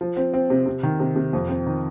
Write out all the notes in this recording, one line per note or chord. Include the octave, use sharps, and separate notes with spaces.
F3
C4
C4
C3
C3
D#3
C3
C3
F2
C4
D#3